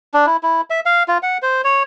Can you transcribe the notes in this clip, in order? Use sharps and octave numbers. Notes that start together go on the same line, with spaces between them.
D4
E4
E4
E5
F5
F4
F#5
C5
C#5